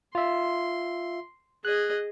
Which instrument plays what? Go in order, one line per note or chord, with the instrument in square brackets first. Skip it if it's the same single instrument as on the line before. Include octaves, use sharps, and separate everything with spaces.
[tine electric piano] F4 E5 [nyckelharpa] C6
[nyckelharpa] G#4 D#5 [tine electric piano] F#6